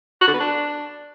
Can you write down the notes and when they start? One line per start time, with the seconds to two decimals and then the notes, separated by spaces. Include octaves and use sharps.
0.21 F#4
0.28 D3
0.34 B3
0.40 D4